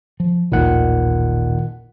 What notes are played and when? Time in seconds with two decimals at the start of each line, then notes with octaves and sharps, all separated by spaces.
0.20 F3
0.52 A1 D#2 A#2 D#3 F#5